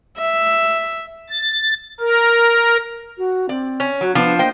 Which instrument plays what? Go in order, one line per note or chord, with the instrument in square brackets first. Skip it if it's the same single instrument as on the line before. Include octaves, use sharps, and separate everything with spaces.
[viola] E5
[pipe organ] A6
A#4
[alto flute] F#4
[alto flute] C4 [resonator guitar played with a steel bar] D5
[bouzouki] C#4
[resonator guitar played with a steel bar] F#3 [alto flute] F#4
[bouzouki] F3 [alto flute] B3 [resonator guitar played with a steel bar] D4
[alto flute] A#3 [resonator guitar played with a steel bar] C5 D#5 G5